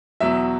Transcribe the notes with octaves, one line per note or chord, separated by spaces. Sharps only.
E2 B2 F#3 E5